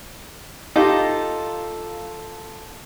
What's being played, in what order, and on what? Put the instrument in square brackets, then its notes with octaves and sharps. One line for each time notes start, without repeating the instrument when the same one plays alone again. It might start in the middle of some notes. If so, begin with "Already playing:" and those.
[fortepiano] D#4 G4 [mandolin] F4 A4 A#5